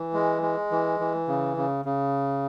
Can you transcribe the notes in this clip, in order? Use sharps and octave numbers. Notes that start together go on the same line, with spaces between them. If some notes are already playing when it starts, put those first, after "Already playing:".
Already playing: E3
G#3
G#3
E3
E3
C#3
C#3
C#3